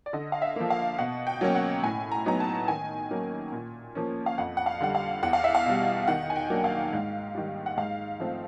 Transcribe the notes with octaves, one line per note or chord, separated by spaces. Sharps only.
D5
D3 D#5
F5
E5
F3 A#3
F5
B2 F#5
G5
F#3 A#3 C#4
F#5
A2 G#5
A#5
F#3 B3 D#4 A#5
A5
D#3 G#5
F#3 A#3 C#4
A#2
F3 A#3 C#4
F5
F2 F#5
F#5
F5
D3 G3 F#5
F5
E2 F#5
F5
E5
F5
B2 G3
D#3 F#5
G#5
G5
F#3 A#3 D4
F5
G#2
D#3 G3
F#5
G#2 F5
F3 A3 C4